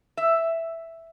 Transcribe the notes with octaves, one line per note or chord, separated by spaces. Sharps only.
E5